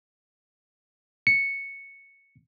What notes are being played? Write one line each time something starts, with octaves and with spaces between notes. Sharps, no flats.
C#7